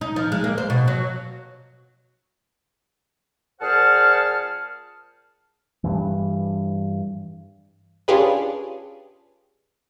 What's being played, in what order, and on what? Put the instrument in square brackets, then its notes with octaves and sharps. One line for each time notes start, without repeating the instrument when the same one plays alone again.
[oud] D#4
F3
G#3
A#3
C5
B2
F#3
[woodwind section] A#2 G#4 C5 F#5 A5 F6
[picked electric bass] G2 E3
[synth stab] C#4 D4 F4 G4 G#4 B4